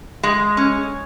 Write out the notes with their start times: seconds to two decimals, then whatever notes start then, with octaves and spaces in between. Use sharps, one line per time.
0.23 G#3
0.57 C#4